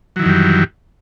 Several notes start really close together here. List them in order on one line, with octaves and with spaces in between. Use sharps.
F#3 E3 D#3 F#2 G3